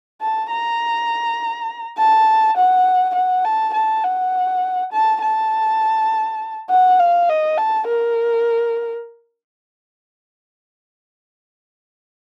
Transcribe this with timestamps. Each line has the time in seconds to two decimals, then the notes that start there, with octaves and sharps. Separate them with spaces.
0.21 A5
0.50 A#5
1.97 A5
2.57 F#5
3.15 F#5
3.45 A5
3.74 A5
4.04 F#5
4.92 A5
5.22 A5
6.70 F#5
6.99 F5
7.29 D#5
7.57 A5
7.87 A#4